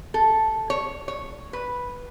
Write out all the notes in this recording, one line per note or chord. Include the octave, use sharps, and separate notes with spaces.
A4
C#5
C#5
B4